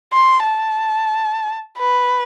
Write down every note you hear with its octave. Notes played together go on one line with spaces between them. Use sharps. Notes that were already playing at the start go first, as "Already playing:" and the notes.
C6
A5
B4